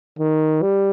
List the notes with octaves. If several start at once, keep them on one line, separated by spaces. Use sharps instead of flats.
D#3
G3